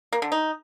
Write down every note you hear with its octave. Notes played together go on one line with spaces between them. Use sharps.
A#3
D3
D#4